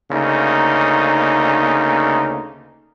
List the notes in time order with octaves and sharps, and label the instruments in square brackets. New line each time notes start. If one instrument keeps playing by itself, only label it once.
[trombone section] D2 C#3 A#3 D#4